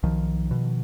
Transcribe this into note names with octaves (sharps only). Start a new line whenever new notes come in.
B1 D#3 F3
B2